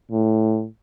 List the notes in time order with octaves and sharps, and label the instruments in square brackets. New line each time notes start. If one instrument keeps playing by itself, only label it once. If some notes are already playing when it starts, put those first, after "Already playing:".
[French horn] A2